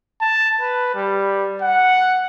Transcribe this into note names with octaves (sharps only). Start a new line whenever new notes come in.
A5
B4
G3
F#5